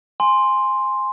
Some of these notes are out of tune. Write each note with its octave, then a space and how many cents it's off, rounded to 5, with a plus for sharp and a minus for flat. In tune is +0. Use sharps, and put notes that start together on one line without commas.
G#5 +0 C6 +0